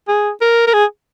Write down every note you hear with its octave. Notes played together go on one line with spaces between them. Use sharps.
G#4
A#4
A#4
G#4